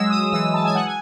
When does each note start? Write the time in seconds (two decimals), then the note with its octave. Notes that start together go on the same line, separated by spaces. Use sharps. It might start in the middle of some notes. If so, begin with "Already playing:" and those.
Already playing: F#3 G#3 E6
0.10 D#6
0.32 E3 E6
0.54 A5
0.65 G#5
0.75 F#5
0.86 G#5